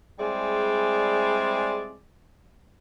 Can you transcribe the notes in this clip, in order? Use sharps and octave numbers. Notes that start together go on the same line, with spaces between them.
G3 G#3 C4 E4 G#4 D5